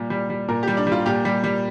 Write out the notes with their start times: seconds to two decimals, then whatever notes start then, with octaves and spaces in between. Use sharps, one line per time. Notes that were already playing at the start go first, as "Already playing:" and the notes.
Already playing: A#2 G3
0.10 G3
0.30 G3
0.49 A#2 A#4
0.63 G3 G4
0.77 D4
0.87 G3 F4
1.06 A#2 G4
1.25 G3
1.44 G3